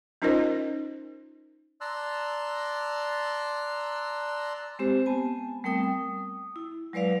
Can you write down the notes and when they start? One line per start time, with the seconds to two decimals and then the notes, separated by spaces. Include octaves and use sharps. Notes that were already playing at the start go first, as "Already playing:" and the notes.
0.22 C#4 D#4 F4 A#4 C5 D#5
1.81 D5 A5 A#5 C6 E6 F#6
4.79 G#3 C4 G4 C5
5.06 B3 G#5 A5
5.64 G3 A3 C4 A#4 G5 D#6
5.83 D#6
6.56 E4
6.93 F#3 G#3 B4 D5 F5